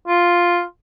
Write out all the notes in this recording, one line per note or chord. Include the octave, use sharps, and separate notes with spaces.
F4